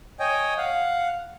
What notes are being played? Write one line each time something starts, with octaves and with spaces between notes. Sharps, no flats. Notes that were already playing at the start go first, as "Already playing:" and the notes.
C#5 D#5 G5 G#5
F5 F#5